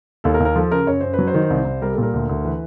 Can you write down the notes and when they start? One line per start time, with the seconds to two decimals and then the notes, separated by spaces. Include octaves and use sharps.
0.24 D#2 A4
0.34 A#4
0.40 D#2
0.45 A#4
0.55 F3 A4
0.71 C#3 A#4
0.87 F#2 C#5
1.00 F#2 C5
1.13 B4
1.19 F#3
1.27 C5
1.34 D#3
1.50 C2
1.65 C2
1.82 G3 A#4
1.93 A4
1.98 A#2 A#4
2.14 D2
2.29 D2
2.45 E3 B4